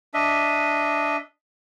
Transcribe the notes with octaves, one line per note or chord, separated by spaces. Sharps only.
D4 D#5 E5